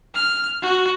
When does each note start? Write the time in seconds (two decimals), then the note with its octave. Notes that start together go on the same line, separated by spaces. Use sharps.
0.15 F6
0.62 F#4